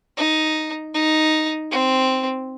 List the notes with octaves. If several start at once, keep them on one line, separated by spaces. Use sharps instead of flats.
D#4
D#4
C4